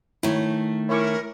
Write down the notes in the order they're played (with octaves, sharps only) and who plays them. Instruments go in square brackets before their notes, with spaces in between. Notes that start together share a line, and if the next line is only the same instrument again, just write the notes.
[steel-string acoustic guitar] D#3 A3 [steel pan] E4 C#5
[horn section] C#4 E4 [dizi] A#4 [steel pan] C#5 C#6 D6